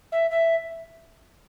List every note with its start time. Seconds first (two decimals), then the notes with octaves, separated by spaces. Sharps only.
0.12 E5
0.30 E5